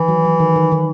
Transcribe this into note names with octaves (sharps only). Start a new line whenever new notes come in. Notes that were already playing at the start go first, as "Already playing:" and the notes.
Already playing: D#3 E3
F#3
F#3
D#3
D#3
D#3